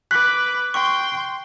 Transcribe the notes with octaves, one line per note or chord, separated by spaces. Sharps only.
B4 D6 F#6 B6
G5 C6 C#6